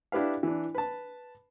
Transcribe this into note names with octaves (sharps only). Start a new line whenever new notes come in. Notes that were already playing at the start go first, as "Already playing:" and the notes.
D4 E4 G4 B4 F5
E3 D4
B4 A5